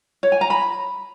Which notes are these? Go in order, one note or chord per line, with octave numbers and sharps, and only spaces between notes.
C#5
G#5
A#5
B5